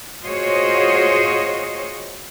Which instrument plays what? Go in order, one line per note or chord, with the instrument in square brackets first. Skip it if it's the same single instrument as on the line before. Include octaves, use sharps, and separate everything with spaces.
[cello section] F4 F#4 G#4 C5 C#5 D#5